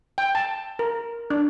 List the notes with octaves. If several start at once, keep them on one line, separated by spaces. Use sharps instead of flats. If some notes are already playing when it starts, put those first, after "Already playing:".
G5
A5
A#4
D4